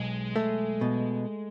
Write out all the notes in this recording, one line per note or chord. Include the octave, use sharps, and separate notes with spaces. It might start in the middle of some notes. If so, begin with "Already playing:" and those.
Already playing: B1 G#3
A3
B2